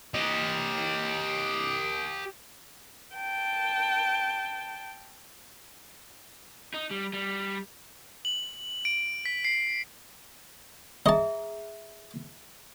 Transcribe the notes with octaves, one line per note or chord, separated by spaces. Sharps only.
G4 D#5
G5 A5
D#4
G3
G3
F#7
D7
B6
C7
G#4 D#5 E5 A5 A#5